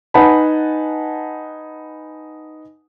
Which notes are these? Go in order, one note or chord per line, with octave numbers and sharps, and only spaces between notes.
D#4 B4 F#5 G#5 A5 B5